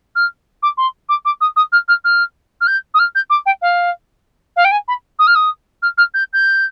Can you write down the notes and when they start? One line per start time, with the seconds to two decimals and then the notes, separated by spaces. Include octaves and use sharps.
0.15 F6
0.62 D6
0.77 C6
1.09 D6
1.25 D6
1.41 D#6
1.56 D#6
1.72 F6
1.88 F6
2.04 F6
2.61 F6
2.67 G6
2.94 D#6
2.99 F6
3.15 G6
3.30 D6
3.46 G5
3.61 F5
4.56 F5
4.64 G5
4.71 G#5
4.88 B5
5.19 D#6
5.27 F6
5.35 D#6
5.82 F6
5.97 F6
6.14 G6
6.33 G6